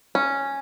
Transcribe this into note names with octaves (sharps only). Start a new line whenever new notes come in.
C#4